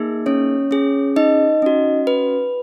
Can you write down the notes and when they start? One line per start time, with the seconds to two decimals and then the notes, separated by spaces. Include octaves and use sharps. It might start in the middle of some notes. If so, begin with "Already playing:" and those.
Already playing: A#3 D#4 G#4
0.26 C#4 C#5
0.71 C#4 G#4
1.16 D#4 D#5
1.62 C#4 F#4
2.07 B4